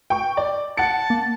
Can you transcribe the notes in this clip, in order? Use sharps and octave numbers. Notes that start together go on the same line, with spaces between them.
G5 C#6
D5
F#5 A5 C#7
A#3